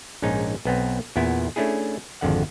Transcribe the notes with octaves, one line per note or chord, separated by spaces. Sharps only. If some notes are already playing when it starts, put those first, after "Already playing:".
A#1 G#2 C#4 D#4
B1 B3 C4
E2 A#2 B3 E4
A3 C#4 D4 E4 G#4
G#1 F2 D3 F#5